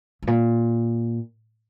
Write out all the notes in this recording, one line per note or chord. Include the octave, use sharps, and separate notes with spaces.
G2
A#2